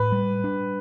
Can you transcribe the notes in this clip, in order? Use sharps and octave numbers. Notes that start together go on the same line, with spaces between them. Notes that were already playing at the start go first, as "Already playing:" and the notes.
Already playing: A2 B4
G3
D4